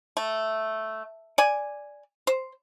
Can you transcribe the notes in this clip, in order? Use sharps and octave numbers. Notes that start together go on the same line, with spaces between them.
A3
D5 G#5
C5